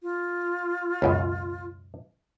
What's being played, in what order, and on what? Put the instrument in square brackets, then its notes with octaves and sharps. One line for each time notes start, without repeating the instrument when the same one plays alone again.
[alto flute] F4
[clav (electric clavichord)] C#2 F#2 B2